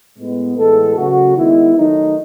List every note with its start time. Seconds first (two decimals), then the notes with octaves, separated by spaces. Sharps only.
0.16 A2 G#3 B3
0.56 A2 E3 G#3 B3 A4
0.95 C#3 F#3 A3 F#4
1.35 D#3 G#3 B3 E4
1.75 D#3 F#3 A3 D#4